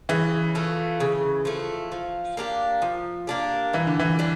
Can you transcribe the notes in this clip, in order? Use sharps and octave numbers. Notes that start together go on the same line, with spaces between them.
C#3 E3
F3 A3
C#3
F3 A3
F3
A#3 D4 G4
F3
A#3 D4 G4
A#2 E3
D3
E3
G3 D4